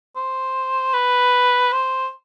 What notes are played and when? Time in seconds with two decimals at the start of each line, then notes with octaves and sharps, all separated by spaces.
0.16 C5
0.94 B4
1.72 C5